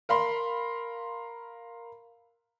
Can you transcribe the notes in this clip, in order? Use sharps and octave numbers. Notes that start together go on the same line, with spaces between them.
A#4 F5 B5 C6